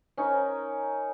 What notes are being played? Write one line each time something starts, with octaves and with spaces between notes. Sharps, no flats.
C#4 D#4 A#4 C#5